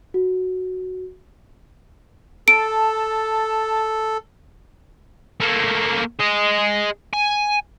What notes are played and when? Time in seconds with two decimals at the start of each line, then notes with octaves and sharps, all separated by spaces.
0.14 F#4
2.48 A4 A5 D7
5.40 A3 A#3
6.19 G#4 D#5
7.14 G#5